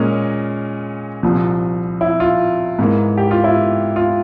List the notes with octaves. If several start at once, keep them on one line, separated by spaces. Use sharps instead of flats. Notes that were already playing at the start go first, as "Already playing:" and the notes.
Already playing: A#2 G#3 C#4 A#4
C2 A#2 F3
E4
F4
G#2 E3 A#3
G4
F4
E4
F4